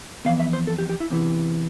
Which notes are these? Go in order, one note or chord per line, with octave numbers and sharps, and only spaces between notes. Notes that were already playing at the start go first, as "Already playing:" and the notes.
F2 E3 B3 F5
E5
C5
A4
G4
G4
E4
E2 C3 E3